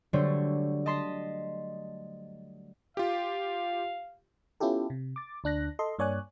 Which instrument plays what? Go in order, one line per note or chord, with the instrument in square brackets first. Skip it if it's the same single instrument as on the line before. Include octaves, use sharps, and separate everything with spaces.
[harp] D3 F#3 G3 A3 C5 C#5
D#5 A5 C6 B6 C7
[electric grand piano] F4 G4 [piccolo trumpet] F5
[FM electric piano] B3 C#4 E4 F4 G4 A4
C3
D6 A6
D2 D4 F#6 A#6
A4 D#5 C6
G2 A#3 C#5 D5 G#5 F#6